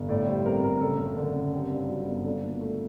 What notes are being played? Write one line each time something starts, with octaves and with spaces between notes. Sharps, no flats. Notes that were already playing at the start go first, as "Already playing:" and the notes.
Already playing: G1
A2 D5
G3 C5
C4 A#4
A2 A#4
F#1 A4
F#2
D3
F#1
C4 G4
G2
F#3
G1
D4 A4
A#2
A3